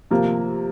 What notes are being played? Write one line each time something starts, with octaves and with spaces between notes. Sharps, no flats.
C3 F3 A#3